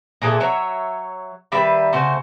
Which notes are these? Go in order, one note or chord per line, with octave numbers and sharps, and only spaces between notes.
A#2 E3 G#4 A4
F#3 C#5 E5
D#3 G3 B4 E5
C#3 A3 F#4 C5